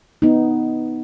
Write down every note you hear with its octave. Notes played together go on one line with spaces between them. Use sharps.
B3 D#4